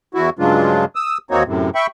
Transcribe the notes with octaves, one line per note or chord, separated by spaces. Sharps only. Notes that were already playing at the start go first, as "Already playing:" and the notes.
E2 E4 F#4
G2 C#3 F#3 G#3 D4 F4
D#6 E6
D#2 A#3 C4 D#4 F#4 C#5
F#2 A2 C3
E5 G5 B5 C#6